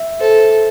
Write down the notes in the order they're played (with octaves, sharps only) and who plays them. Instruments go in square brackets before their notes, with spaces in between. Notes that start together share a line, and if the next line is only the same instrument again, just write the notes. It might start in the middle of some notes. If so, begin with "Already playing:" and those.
Already playing: [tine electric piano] E5
[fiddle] A4 [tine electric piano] C5